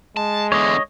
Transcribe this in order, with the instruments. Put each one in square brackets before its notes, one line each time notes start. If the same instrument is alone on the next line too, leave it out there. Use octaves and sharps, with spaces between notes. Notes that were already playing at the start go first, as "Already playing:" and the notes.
[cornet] G#3 [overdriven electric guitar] A5
[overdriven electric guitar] E2 D3 [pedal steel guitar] C#5 D#5